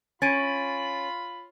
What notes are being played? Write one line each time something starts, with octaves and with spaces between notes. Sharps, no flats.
C#4 F4 B5 A6 D7 D#7